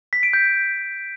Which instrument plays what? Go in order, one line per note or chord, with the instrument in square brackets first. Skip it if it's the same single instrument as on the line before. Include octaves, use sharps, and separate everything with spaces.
[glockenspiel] B6
D7
G6